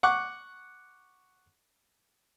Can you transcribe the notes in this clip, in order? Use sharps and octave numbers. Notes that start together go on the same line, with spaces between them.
F#5 C#6 D6 F#6